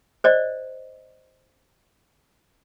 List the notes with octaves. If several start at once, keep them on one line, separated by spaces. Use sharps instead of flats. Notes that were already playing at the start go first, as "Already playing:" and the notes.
C5 D5 D#5